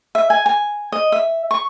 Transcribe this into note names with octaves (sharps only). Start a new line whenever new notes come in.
E5
G#5
G#5
D#5
E5
C#6